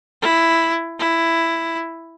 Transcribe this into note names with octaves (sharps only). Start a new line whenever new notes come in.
E4
E4